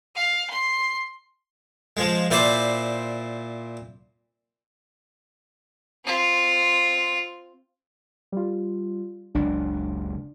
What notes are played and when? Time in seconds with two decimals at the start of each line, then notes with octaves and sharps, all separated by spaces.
0.15 F5
0.50 C6
1.97 F3 G#3
2.31 A#2 E4 C5 D5 D6
6.05 C4 F4
8.32 G3 F4
9.35 F#1 C#2 D4